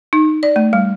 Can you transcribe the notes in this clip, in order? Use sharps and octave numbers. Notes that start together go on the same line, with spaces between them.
D#4
D5
A3
G3